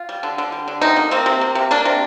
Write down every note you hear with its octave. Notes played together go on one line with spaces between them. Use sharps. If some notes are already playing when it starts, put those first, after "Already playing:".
Already playing: F4
G3
D3
D3
G3
D3
C3 D#4
A#3
A#3 C4
C3
A#3
C3
A#3 D4
C3